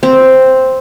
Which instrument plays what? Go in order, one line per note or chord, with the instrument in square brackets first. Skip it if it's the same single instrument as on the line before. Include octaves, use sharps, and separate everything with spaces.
[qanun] C4